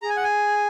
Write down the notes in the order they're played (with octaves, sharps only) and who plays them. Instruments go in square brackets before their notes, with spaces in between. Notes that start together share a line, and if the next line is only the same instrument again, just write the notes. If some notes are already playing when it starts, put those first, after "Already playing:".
[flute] G#4 [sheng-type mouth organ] A#5
[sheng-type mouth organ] G#5
F#5
G#5